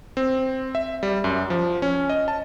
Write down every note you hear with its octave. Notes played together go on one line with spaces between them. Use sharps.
C4
E5
G3
F#2
F3
C#4
D#5
A5